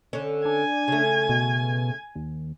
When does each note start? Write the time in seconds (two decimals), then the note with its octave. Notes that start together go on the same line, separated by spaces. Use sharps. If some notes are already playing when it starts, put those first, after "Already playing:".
0.13 D3 C#4
0.45 D4 G#5
0.88 C#3 A3
1.29 B2
2.15 D#2